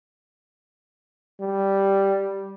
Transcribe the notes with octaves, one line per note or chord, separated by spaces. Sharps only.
G3